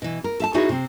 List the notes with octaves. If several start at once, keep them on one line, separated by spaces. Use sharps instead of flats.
B2 E3
A#4
A4 E5 A5
D#4 E4 F#4 G#4 A#4 C#5
C3 C4